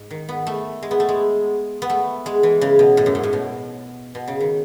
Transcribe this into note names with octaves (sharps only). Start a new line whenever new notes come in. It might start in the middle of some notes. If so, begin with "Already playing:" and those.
Already playing: G#2
D#3
B3
A3
G#3
B3
A3
G#3
B3
A3
G#3
E3
C#3
B2
A2
F#2
G#2
A2
B2
B2
C#3
D#3